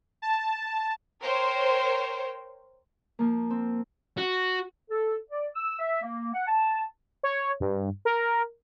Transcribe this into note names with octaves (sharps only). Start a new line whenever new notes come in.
A5
A#4 C5 C#5 G5
F3 A#3
C4
F#4
A4
D5
E6
E5
A#3
F#5
A5
C#5
G2
A#4